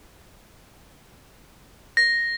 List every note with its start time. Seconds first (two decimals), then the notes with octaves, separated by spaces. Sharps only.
1.97 A#6